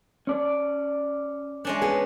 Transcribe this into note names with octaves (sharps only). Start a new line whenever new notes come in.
C#4 D5
G#3 C#4 D4
B3 G#4